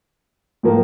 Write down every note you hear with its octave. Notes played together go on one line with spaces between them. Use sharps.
A2 F3 A#3